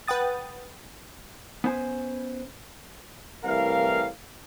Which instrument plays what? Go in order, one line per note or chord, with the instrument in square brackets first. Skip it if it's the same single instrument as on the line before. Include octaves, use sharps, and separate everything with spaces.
[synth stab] B4 F#5 G5 D#6 A6
[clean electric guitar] B3 C#4 B4 C5 G#5
[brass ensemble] C2 A2 E3 A#4 F5